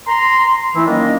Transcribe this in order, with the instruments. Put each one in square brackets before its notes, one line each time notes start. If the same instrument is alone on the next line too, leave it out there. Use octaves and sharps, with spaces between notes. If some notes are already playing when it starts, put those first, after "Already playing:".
[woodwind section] A#5 C6
E3 A3 E4
D#3 F#3 A#3 C#4 D4 D#5